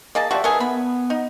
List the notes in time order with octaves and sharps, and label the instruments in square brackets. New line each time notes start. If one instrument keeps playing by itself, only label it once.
[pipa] A#3 G#4 A5 [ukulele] D#5
[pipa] F3 F#4 [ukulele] G4 D5 [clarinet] E5
[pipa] A3 D#4 G#4 [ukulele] A#4 B4 G#5
[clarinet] B3 [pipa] B5
[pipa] D#4